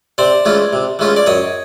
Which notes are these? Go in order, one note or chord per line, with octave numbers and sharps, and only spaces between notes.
C3 C5 D5
E3 G#3 C#4 F4
C3
E3 G#3 C#4 F4
D5
F#2 C#5 D#5